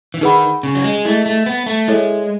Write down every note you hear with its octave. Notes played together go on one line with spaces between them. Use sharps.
E3
D#3 D#4 G#4 B4 F#5 B5
C#3
F#3
G#3
A3 E4 G#4 D#5
A3
B3
A3
G#3 E4 A4 C#5 E5